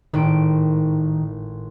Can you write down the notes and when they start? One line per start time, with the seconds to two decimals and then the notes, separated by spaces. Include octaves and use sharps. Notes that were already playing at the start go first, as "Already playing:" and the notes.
0.13 G#1 A2 D#3 D7